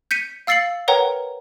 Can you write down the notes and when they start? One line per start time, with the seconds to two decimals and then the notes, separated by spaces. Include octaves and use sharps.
0.11 G6 B6 C#7 D#7
0.47 F5 E6 A6 C7 C#7 F#7
0.88 A#4 B4 C#5 F#5 G5 A#5